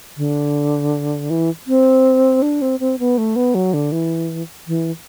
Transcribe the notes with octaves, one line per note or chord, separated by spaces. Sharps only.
D3
E3
C4
D4
C4
C4
B3
A3
B3
F#3
D3
E3
E3